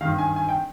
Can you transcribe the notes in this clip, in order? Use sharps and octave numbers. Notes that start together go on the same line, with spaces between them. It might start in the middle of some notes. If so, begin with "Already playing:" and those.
G2 D#3 F5
G#5
G#5
G5